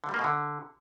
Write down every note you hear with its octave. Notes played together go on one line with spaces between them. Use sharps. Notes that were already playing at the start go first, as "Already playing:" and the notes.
D3
G3
A#3
B2
D3